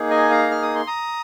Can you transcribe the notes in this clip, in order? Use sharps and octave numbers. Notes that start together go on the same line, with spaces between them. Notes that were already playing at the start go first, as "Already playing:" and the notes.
Already playing: A#3 D#4 G#4
D#5 G#5
F5 A#5
F6
D#6
C6
A#5 D#6